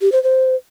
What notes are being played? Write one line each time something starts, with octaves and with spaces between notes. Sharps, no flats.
G4
C5
C5